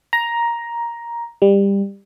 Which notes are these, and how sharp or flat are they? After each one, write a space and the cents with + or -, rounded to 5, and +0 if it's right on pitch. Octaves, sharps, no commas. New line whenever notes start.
A#5 +10
G3 +20